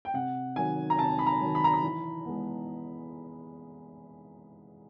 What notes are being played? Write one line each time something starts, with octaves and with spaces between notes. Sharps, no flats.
G5
C3 F#5
D#3 F#3 G#5
A#5
C3 A5
B5
A#5
D#3 F#3
B5
A#5
B5
E3
G#3 B3